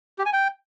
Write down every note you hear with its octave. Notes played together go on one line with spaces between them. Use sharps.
G4
G#5
G5